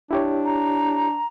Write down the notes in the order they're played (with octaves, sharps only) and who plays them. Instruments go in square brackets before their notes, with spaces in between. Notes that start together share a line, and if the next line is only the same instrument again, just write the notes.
[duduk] D4 [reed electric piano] E4 G4 C#5
[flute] A#5